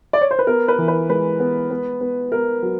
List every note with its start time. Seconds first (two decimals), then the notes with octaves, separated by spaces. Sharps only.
0.13 D5
0.21 C#5
0.31 C5
0.39 B4
0.47 B3 A#4
0.68 B4
0.78 E3
0.88 B4
1.10 G#3 B4
1.40 B3
1.71 B3
2.01 B3
2.32 B3 A#4
2.63 F#3